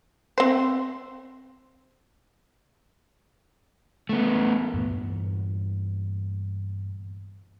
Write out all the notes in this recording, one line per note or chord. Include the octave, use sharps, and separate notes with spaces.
C4 C5
A3 B3
G2 A#2 E3 B3